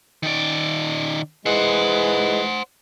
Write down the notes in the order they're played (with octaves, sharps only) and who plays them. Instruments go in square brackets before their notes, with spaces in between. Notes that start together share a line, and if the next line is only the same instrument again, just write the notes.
[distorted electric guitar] D#3 D5
[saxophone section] E3 G#3 [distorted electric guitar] C5 F#5